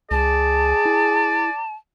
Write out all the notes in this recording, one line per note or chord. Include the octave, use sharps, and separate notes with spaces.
C#2 G#4 D5 A5
E4